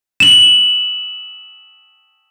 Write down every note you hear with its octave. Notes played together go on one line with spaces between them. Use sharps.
E7 F#7